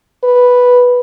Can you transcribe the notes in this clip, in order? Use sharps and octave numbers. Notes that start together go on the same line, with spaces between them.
B4